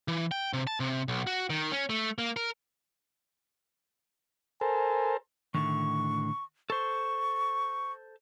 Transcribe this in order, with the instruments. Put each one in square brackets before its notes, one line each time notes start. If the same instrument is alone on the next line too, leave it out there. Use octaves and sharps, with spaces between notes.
[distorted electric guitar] E3
G5
C3
A5
C3
B1
F#4
D#3
C#4
A3
A#3
A#4
[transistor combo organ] A4 A#4 C5 [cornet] G#5
[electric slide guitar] A2 D3 D#3 [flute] C#6
[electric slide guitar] A4 C5 [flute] C#6